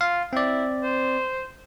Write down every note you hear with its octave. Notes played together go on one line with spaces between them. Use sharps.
F4 F5
C4 E4 D5
C5